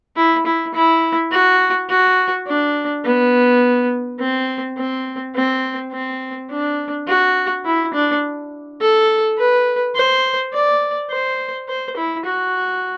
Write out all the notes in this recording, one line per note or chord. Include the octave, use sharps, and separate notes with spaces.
E4
E4
E4
F#4
F#4
D4
B3
C4
C4
C4
C4
D4
F#4
E4
D4
A4
B4
C5
D5
C5
C5
E4
F#4